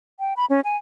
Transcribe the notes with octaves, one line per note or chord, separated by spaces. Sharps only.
G5
B5
C#4
G#5